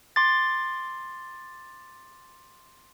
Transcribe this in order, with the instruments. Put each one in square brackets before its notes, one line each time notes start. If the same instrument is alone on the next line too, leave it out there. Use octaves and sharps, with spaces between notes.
[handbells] C6 D6 A6